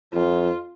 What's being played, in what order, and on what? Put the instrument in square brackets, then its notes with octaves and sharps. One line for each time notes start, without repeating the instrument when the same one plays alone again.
[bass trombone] F2 [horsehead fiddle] F4